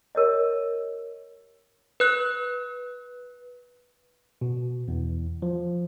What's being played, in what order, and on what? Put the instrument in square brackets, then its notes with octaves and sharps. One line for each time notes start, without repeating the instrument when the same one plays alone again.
[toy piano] G4 A#4 C#5 D#5
[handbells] B4 F#6
[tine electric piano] B2
E2
F3